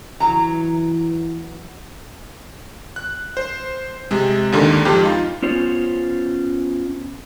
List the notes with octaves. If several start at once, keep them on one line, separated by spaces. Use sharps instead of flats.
E3 F#3 A#5
F#6
C5
C3 G#3
D#2 G#2 D3 D#3
F2 G#2 G4
D#4 F4
B3 C#4 F4 C5 C#5